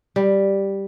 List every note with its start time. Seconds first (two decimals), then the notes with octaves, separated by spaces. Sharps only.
0.16 G3